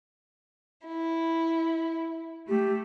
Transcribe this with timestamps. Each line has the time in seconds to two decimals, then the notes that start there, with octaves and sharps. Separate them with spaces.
0.86 E4
2.48 A3 G4